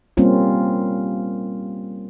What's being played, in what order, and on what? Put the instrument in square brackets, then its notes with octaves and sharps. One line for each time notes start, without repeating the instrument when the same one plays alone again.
[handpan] G3 A#3 C4 C#4 F4